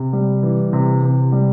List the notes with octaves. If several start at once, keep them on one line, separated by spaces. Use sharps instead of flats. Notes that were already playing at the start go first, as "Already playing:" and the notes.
Already playing: C3
G3
E3
C3
C3
G3